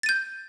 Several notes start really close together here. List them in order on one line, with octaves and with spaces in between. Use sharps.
A6 D#7 G6